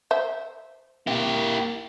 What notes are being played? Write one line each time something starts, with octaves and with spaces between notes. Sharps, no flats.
C5 E5
A#3 E4 G4